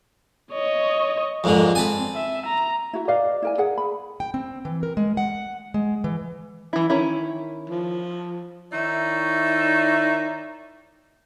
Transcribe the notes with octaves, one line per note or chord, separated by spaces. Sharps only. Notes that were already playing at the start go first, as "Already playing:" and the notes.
C#5 D#5
F2 G#2 D3 A#4
C4 G#5 A5 B5
E5
A#5
E4 F#4 E5
B4 D5 D#5 F5
E4 A#4 G#5
G#4 A#4 F#5
B5
G5
C4
E3
A#4
G#3
F#5
G#3
E3
E3 E4
D#3 C#4 E4
F3
D#3 D#4 E4 C#5 D5 E5